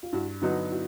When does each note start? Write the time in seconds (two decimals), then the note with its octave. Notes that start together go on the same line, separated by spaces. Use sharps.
0.03 F4
0.13 G2 E4 F#4
0.42 D3 F#3 B3 D#4 E4 F#4
0.71 E4 F#4